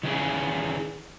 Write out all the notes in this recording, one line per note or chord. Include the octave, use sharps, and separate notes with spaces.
D#3 E3 C#4 G#4